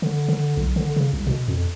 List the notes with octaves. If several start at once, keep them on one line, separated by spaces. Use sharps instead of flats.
D3
D3
B1
D3
C#3
C2
B2
F2